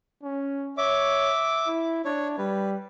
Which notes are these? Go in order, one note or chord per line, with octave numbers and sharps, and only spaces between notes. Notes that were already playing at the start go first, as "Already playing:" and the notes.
C#4
C#5 E5 D6
E4
D4 C#5
G3 B4